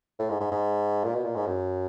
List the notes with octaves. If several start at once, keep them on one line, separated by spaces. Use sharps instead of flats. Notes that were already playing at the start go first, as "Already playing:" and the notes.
A2
G#2
G#2
G#2
A#2
B2
A#2
G#2
F#2